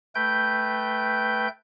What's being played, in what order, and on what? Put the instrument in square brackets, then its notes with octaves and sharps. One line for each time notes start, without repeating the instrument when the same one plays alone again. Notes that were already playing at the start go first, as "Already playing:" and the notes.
[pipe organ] A3 B4 G5 G6